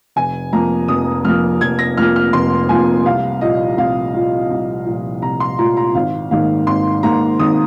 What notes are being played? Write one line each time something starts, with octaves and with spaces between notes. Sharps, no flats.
F1 G#5
F2 F3 A#3 A#5
F1 D#6
F2 F3 A#3 F6
F1 G#6
A#6
F2 F3 A#3 F6
F6
F1 C6
F2 F3 A#3 G#5
C2 F5
A#2 F3 D#5
C2 F5
A#2 F3
C2
A#2 F3
C2 A#5
C6
A#2 F3 A#5
A#5
G#1 F5
G#2 D#3 A#3 F5
G#1 C6
G#2 D#3 A#3 A#5
G#1 D#6